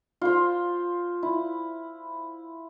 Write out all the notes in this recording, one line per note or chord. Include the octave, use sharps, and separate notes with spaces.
F4 C5
E4